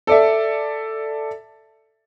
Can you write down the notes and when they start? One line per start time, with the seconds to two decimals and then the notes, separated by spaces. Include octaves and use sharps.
0.07 A4 D5 E5